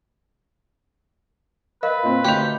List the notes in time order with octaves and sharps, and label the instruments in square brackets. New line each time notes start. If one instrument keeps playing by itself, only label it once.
[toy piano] A#4 D#5 F5 [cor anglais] B4
[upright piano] A#2 C4
[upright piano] D2 F7 [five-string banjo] D#4 G4 [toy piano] G5